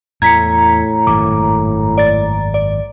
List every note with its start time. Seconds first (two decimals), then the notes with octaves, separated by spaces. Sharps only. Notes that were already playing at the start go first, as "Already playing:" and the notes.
0.22 E2 A2 A#5 G#6 B6 C#7
1.07 G#1 F#2 A#2 D6
1.98 D5 A6
2.54 D5